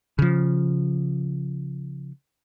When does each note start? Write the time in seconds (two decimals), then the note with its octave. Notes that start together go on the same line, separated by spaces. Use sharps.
0.19 C#3 F3